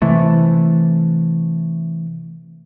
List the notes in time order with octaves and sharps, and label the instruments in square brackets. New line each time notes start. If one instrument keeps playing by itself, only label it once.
[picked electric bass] C3 E3 A3